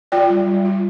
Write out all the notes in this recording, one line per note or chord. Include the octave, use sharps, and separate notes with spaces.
F4 D5 G5
G3
G3
F4